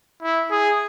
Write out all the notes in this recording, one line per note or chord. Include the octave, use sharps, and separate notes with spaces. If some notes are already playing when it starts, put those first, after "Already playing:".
E4
G#4